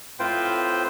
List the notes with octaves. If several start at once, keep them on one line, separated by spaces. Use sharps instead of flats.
A2 C4 F4 B4 C5 G5